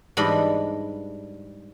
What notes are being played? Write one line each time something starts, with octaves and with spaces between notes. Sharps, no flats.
G#2 E3 G3 D4 D#5 B5